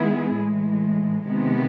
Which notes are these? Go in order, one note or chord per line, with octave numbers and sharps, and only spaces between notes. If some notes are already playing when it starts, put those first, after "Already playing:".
Already playing: D#3 G#3 B3 E4 G#4
A2 E3 G#3
C3 D#3 G#3 B3